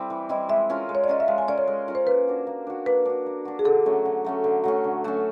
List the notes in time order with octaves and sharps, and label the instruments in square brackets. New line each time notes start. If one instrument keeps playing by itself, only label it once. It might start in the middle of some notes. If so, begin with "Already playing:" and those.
Already playing: [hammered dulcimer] G3 C4 E4
E3
[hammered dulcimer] G3 C4 E4 [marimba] D#5
[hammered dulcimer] G#3 [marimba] E5
[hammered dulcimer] C#4 F4 A#4
G#3
[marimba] C#5
D5
[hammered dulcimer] C#4 F4 A#4 [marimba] D#5
[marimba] E5
[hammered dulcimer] G#3 [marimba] F5
[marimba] G#5
[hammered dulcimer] C#4 F4 A#4 [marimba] D5
[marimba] C#5
[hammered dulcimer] G#3
C#4 F4 A#4
[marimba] C5
[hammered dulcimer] A#3 [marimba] B4
[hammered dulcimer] D4 F#4
A#3
D4 F#4
[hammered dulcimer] A#3 [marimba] B4
[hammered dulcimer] D4 F#4
A#3
D4 F#4
[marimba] G#4
[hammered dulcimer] D3 [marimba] A4
[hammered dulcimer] F#3 A3 C#4
D3
F#3 A3 C#4
D3
F#3 A3 C#4
D3
F#3 A3 C#4